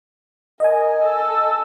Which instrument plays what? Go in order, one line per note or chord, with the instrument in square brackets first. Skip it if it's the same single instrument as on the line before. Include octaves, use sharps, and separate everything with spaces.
[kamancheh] A#4 [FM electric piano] D#5 G#5
[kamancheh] A4 E6